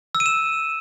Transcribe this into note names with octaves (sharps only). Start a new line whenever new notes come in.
E6
D#7
E7